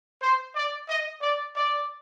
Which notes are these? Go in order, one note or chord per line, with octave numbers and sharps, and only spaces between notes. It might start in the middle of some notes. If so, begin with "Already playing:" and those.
C5
D5
D#5
D5
D5